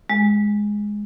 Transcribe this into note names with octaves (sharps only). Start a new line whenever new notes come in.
G#3